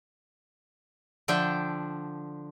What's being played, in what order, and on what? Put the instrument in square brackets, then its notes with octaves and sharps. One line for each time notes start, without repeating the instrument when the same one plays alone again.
[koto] D3 F3 D4 E5 G5